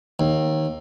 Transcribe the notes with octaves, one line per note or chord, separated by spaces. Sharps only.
D#2